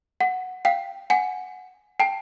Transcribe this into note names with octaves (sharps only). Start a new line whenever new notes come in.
F#5
F5 G5
F#5 G#5
G5 A5